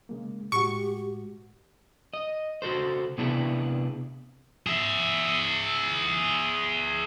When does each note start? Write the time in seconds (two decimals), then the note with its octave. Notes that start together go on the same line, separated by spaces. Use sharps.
0.09 C#3 G#3 A#3
0.52 A2 G#3 F#4 G4 C#6
2.14 D#5
2.62 C#3 F#4 A4 C5
3.18 C3 B3 D4 E4 G#4
4.67 G#4 E5